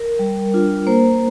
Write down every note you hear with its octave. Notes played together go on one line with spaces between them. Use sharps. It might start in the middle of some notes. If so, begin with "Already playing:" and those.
Already playing: A#4
G3
D4 F4
A#3 C5